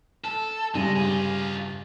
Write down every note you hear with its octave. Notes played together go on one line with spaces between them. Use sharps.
A4
G2 C#3 G3 G#3
F4 G#4